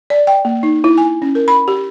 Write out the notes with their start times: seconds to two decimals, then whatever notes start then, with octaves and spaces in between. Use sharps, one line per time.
0.10 D5
0.27 G5
0.45 A#3
0.63 D#4
0.84 E4
0.98 G#5
1.22 C#4
1.35 A#4
1.48 B5
1.68 G4